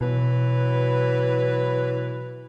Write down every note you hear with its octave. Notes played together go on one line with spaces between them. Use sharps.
B2 E3 F#3 B4